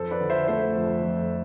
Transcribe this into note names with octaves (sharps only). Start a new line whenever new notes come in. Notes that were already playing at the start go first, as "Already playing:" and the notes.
Already playing: F2 A4 C5
B4 D5
D3
C5 E5
A3 A4 C5
F2
F2